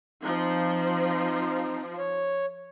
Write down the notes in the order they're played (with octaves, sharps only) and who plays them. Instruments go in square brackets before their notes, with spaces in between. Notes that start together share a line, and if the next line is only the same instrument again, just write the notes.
[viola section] F3 [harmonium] C4 D#4
[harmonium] C#5